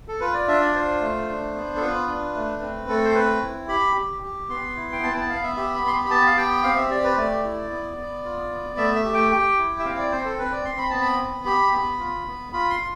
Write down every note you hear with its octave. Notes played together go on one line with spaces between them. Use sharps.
A4
F4 B4
D5
D4 E5
D5
F4 C5
A3
D4
B3
A4
F4 B4
D4
A3
C4
A3 A4
C5
C4 B4
E4
G4 B5
G4
G4
B3 C6
E4
G5
B3 A5
G5
A5
B3 F5
E5
G4 E5
B5
B3 C6
B5
B5
B3 A5
F5
G4 G5
C4 F5
E5
G4 D5
B4
A3 D5
E4
B3
B3
F4
B3
A3 E5
E5
G4
G5
G4 G5
E4
E5
C4 F5
D5
C4 C5
A4
C4 B4
D5
C4 C6
B5
B3 A5
B5
B3
G4 B5
B3
F4
B3
F4 B5
C6
F4